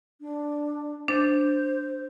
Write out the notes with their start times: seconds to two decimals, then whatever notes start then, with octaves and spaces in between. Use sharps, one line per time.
0.21 D4
1.08 D4 C5 A6